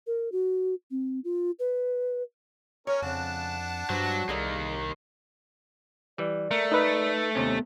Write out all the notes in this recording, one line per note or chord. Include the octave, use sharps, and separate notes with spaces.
A#4
F#4
C4
F4
B4
C#4 A#4 C#5
F2 C#3 D4 F#5 A5
G2 F#3 C5
C2 D#3 A#3 G#4 A4 D5
E3 G3 D5
A3 A#4
D#4 B4 E6
D#2 C3 B3 C#4